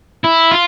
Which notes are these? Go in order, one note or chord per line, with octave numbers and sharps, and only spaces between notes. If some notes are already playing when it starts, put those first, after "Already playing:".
E4
F4